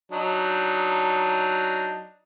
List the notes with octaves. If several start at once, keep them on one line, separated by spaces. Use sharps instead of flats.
F#3 D4 D#4